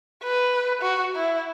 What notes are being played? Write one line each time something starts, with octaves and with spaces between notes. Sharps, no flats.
B4
F#4
E4